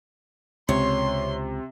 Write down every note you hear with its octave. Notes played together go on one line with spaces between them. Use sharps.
C#2 C3 C#5 C6